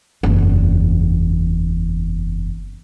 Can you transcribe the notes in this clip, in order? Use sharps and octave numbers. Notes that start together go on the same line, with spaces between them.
F#1 E2